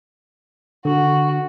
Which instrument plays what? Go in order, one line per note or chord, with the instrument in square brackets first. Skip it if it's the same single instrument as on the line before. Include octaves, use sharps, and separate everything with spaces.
[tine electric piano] D3 [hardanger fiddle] F#4